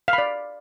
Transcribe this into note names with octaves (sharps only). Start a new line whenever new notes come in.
F5
B5
D5